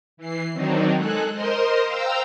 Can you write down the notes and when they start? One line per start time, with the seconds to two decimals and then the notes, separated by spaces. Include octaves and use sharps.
0.17 E3 C7
0.53 D#3 F#3 C4 D4 D#4
0.95 G#3 G#4 A4 F#6
1.33 A#4 C5 D#5 C6
1.85 C5 F5 G5 A#5 E6